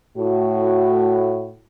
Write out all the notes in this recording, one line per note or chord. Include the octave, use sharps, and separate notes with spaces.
A2 F#4